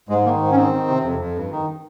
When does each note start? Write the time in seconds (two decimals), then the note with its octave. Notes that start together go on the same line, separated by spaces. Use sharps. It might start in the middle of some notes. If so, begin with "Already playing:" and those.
0.09 G#2 G#3
0.25 D#3 A#3
0.41 G#2
0.51 C#4
0.56 D#3 C4
0.72 D#3
0.88 C3
1.03 F2
1.19 F2
1.35 G2
1.51 D#3